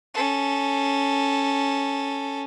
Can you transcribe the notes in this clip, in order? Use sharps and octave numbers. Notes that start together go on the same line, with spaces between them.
C#4 A4